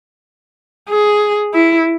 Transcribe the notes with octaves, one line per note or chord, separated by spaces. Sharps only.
G#4
E4